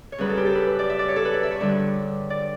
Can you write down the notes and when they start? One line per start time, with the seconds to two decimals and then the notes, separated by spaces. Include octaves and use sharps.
0.12 C#5
0.18 F#2 C#3 G3 B4
0.29 A4
0.37 G4
0.46 A4
0.55 B4
0.67 B4
0.79 D5
0.89 E5
0.99 D5
1.08 C#5
1.16 A4
1.25 B4
1.33 D5
1.43 E5
1.51 C#5
1.60 G2 D3 G3
2.30 D5